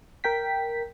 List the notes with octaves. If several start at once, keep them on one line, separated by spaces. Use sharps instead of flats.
A#4 G5 B6